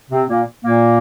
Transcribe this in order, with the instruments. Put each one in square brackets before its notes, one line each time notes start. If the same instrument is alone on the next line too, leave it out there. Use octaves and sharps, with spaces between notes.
[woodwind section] C3 C4
A#2 A#3
A#2 A#3